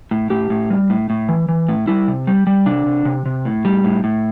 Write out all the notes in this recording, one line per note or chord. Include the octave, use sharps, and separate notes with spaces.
A2
A2 G4
A2
G3
A2
A2
E3
E3
A2
G3 E4
C3
G3
G3
C3 D4
C3
C3
C3
A2
G3
A2
A2